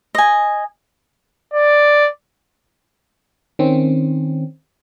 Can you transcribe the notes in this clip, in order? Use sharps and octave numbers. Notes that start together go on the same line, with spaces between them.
D#5 G#5
D5
D#3 C4 C#4